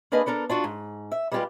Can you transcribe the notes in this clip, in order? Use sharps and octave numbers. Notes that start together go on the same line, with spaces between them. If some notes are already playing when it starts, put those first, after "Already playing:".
A#3 D4 G#4 B4 D#5
B3 D4 A4 A#4
D4 F4 F#4
G#2
E5
G3 G#3 B3 F4 G4 B4